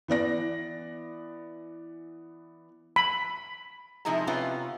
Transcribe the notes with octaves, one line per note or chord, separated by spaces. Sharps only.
E3 B3 D5 A#6
B5
C3 F3 G#3 D#4 E4 A#5
C3 B3 C#4 F4 B4